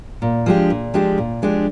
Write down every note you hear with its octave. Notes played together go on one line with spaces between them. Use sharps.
A#2
F3 G#3 D4 G4
A#2
F3 G#3 D4 G4
A#2
F3 G#3 D4 G4